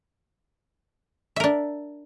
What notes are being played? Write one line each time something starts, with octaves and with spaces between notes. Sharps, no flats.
D4 A#4 E5